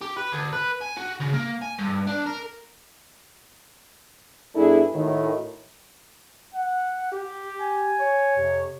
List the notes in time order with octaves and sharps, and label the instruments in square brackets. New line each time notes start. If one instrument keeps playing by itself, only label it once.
[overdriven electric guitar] G4
B4
D2
B4
G#5
F#4
C#3
A#3
G#5
G2
D4
A#4
[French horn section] G2 B3 D4 E4 G#4 A4
A2 D#3 F#4
[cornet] F#5
G4
[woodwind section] G#5
[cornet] C#5
[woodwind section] F2 C3